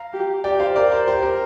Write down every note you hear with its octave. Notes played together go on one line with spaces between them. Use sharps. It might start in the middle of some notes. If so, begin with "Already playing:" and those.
Already playing: F5 A#5
G4
G4 D5 G5
C5 F5
A#4 D5
C5
G4 C5
A#4